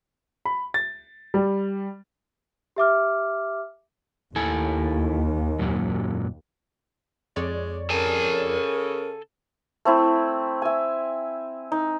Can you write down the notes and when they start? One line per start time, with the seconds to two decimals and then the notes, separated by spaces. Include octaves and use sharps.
0.45 B5
0.74 A6
1.34 G3
2.76 G4 E5 D6 F6
4.36 D#2 E4 A4 G#5
5.59 F#2 A#2 F#3
7.36 F2 G#3 C#5 D5
7.90 C#3 A4 A#4 G#5 A5
9.85 A3 C4 E4
10.62 E5 G#5
11.72 D#4